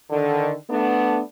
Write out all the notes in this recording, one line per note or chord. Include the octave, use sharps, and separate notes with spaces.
D3 D#3
A3 B3 D4